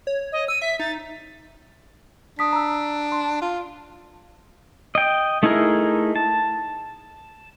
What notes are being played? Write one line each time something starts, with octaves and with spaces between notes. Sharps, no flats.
C#5
D#5
E6 D#7
E5 B6
D#4 A6
D4 D#6 B6
A#5 E6
C6
F4
D#5 G5
A3 D#4 E4 G#4 A#4
A5